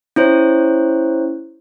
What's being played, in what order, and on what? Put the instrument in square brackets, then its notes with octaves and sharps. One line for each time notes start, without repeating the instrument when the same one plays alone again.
[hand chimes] C#4 E4 C5 C#5